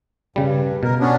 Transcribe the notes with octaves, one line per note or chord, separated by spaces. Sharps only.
G2 C#3 G3
B2 A#4
B3 C#4 D4